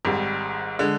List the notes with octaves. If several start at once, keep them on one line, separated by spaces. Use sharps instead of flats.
G#1 G#2 G3
D3 G#3